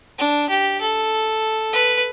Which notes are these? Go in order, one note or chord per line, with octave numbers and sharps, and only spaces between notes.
D4
G4
A4
B4